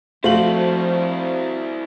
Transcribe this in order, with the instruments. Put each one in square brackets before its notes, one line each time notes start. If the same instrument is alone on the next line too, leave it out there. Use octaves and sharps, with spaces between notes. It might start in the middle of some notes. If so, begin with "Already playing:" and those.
[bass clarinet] F3 [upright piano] A3 F5 F#7 [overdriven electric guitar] C4 E4 [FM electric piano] F#4 C5